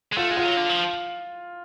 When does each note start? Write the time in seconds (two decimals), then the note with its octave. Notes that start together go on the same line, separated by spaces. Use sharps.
0.12 G#3
0.17 A3 F4
0.30 G#3
0.37 F4
0.44 F#3
0.57 D3
0.69 F3